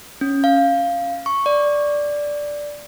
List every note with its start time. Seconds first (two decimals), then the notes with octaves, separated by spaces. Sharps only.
0.21 C#4
0.44 F5
1.26 C#6
1.46 D5